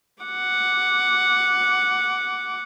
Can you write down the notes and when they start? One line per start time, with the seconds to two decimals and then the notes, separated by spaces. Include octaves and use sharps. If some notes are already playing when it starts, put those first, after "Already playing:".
0.23 F#5 D6